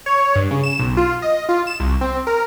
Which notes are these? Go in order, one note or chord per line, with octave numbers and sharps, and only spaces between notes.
C#5
G2
C#3
E7
B1
F4
D#5
F4
E7
C2
C4
A#4